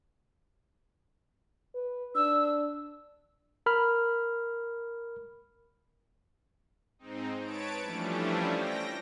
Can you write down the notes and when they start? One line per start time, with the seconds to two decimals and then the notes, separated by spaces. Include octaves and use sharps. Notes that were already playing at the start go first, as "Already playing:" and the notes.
1.75 B4
2.15 D4 E6
3.66 A#4 B5 F6
6.99 G#2 C4 D#4
7.41 B4 C#5 A5 D7
7.82 E3 F3 G3 A3 C#4 D4
8.53 G5 A#6